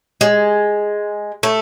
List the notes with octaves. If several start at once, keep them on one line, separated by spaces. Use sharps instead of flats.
G#3
A3